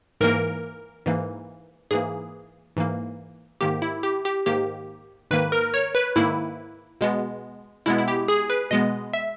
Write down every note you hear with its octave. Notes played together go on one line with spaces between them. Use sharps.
G#2 E3 A#3 A#4
G#2 E3 A#3
G#2 E3 A#3 G#4
G#2 E3 A#3
G#2 D#3 A#3 G4
E4
G4
G4
G#2 D#3 A#3 G4
G#2 D#3 A#3 B4
A#4
C#5
B4
G#2 D#3 A#3 E4
B2 G#3 B3
B2 G#3 B3 E4
E4
G4
G#4
B4
B2 G#3 B3 D#5
E5